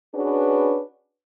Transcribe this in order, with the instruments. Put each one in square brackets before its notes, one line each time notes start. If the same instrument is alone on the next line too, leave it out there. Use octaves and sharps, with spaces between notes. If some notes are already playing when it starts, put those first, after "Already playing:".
[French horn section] C#4 D4 F#4 G#4 B4